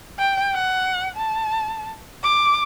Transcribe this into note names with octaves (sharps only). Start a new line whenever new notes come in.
G5
F#5
A5
D6